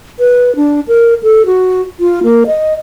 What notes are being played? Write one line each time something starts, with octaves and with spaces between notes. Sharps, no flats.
B4
D4
A#4
A4
F#4
F4
A#3
D#5